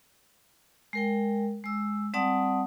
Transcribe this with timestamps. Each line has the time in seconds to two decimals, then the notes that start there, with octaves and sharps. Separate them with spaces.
0.93 G#3 A#4 G5
1.64 G#3 E6
2.14 G3 C4 D5 F#5 A5 D#6